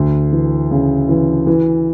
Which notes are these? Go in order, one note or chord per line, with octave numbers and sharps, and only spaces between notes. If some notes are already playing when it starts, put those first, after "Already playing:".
Already playing: D2
E3
C#3
E3
E3